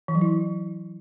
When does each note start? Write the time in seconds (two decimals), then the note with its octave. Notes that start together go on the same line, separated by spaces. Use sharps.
0.08 E3
0.15 F#3
0.21 E4